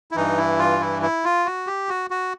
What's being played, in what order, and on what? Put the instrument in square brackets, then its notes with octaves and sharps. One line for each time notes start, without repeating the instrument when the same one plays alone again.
[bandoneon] E4
G2 E3 D#4
E4
F4
E4
E4
F4
F#4
G4
F#4
F#4